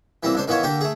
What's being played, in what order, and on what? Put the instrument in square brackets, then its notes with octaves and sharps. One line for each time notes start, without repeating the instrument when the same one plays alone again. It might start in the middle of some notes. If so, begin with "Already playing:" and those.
[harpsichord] E3 G3 A#3 C4
C#2 D4 C5
D#3 E3 B3 F4 C#5
D3 A#3 G4 G5
A3 G#4